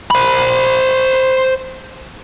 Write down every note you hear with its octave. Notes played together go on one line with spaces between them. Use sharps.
C5 B5